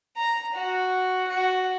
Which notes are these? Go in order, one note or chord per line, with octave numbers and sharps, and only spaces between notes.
A#5
F#4
F#4